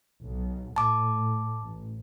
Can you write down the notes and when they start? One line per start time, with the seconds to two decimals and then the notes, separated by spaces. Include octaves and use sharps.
0.23 B1
0.76 A2 A5 D6
1.60 A1